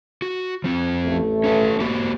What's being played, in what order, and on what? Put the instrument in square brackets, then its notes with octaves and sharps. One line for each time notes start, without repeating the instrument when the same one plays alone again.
[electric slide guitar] F#4
F3 C4
[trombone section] A1 A3
[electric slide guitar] C#4 B4
A#3 F#4 G4